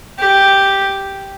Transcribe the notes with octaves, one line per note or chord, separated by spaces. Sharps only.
G4